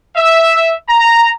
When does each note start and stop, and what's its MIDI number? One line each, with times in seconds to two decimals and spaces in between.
0.16 0.74 76
0.89 1.32 82